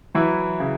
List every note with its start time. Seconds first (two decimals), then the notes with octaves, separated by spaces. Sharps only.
0.15 E3 F#3 E4
0.60 C#3